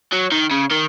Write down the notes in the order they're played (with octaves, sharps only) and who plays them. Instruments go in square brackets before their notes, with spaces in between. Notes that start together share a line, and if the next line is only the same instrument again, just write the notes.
[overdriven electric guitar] F#3
D#3
C#3
D#3